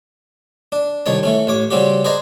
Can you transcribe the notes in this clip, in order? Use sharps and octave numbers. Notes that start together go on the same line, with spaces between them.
D4
C2 D#3 D#4 C#5 A5
E3 A3 C#4
A1 C#5 D6
C#3 G3 C4 C#4 F#4 G4
G#4 B4 C5 D5 D#5 A#5